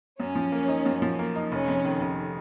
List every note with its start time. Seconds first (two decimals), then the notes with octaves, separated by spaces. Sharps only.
0.20 F#2 C#4
0.35 F3
0.52 A#3
0.68 D#4
0.85 F#2
1.02 F3
1.19 A#3
1.36 D#4
1.52 F1 C#4
1.68 F2
1.85 D#3
2.01 F1